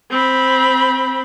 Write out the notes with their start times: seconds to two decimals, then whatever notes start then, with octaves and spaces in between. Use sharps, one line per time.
0.11 C4 B5